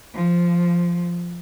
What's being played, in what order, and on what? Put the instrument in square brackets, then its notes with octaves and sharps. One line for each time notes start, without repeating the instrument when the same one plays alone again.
[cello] F3